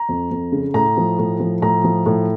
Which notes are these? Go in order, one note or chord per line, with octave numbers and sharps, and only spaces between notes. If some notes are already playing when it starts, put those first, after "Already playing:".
Already playing: A#5
F2
F2
C#3
A2 A#5
F3
A2
F3
A2 A#5
F3
A2